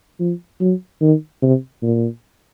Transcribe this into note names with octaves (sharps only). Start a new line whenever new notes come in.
F3
F#3
D#3
C3
A#2